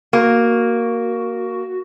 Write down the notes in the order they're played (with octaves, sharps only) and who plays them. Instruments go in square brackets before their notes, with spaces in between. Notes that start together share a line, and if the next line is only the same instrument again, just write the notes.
[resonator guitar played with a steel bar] A#3 [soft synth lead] F#4